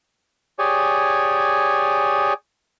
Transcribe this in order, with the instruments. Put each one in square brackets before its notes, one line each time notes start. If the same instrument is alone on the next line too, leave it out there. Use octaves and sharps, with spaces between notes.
[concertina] G4 G#4 C#5 D5 G#5